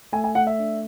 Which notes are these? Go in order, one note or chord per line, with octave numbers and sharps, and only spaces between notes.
A3 G#5
G#5
A3 F#5
E5
D4